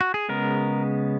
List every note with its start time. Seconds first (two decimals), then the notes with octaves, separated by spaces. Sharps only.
0.01 F#4
0.14 G#4
0.29 C#3 G#3 B3 A#4